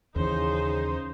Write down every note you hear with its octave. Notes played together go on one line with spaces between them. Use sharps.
D#2 C#3 E3 D#4 C5